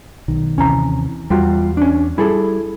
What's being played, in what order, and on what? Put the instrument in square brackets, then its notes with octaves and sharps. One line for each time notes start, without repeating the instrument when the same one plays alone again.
[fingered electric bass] B1 D#3
[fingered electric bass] D#2 C3 E3 [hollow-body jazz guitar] C#4 A#5
[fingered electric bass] E2 [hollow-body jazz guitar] G3 F4 F#4
[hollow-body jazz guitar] C#4 D4
[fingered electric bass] G3 [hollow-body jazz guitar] E4 G#4 A4